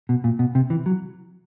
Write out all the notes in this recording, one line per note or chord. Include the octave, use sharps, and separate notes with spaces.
B2
A#2
B2
C3
E3
F#3